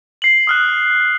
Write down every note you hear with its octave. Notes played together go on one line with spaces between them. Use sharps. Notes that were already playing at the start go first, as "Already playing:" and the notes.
C7 F#7
D#6 F6 F#6